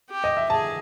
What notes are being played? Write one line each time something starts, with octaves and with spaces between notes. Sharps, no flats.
G4
D#5
E5
G#4 A5